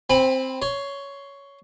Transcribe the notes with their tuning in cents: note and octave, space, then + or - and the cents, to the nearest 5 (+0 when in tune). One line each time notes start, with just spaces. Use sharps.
C4 +0 G#5 -45 B5 +0
C#5 +10 C6 +0